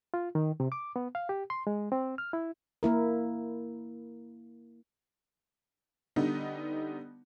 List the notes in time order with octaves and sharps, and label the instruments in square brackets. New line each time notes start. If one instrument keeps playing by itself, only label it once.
[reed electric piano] F4
D#3
C3
D6
B3
F5
G4
C6
G#3
C4
F6
E4
[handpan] A#3 E4 A#4
[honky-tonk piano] D3 G3 B3 D#4